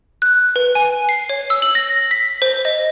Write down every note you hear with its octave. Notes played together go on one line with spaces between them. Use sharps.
F#6
B4
G#5
C7
C#5
E6
F#7
A#6
B6
C5
D#5